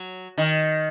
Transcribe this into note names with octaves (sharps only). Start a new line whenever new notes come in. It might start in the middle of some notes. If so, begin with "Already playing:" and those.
Already playing: F#3
D#3